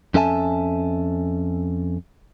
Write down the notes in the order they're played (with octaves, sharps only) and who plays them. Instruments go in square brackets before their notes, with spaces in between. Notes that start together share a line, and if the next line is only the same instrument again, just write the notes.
[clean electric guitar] F2 C#4 A4 E5 G#5 A5